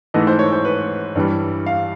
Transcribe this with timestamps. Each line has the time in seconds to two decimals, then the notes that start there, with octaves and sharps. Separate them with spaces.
0.14 G#2 E3 A3 D#5
0.27 C5
0.39 C#5
0.53 C5
0.65 B4
1.15 G2 E3 G3
1.66 F5